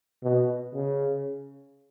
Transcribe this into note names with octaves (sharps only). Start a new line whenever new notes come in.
B2
C#3